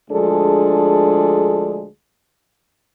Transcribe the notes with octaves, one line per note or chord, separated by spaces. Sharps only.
D2 F3 G#3 D4 G#4 A4